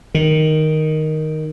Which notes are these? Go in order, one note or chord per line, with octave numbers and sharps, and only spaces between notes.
D#3